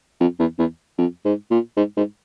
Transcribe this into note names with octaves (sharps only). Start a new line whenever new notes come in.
F2
E2
E2
F2
G#2
A#2
G#2
G#2